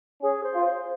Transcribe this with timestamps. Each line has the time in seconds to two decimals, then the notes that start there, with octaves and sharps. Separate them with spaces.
0.22 C#4 G#4
0.43 C5
0.55 F4
0.65 C5